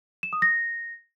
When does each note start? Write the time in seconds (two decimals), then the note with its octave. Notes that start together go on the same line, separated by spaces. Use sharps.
0.23 E7
0.33 D#6
0.42 A#6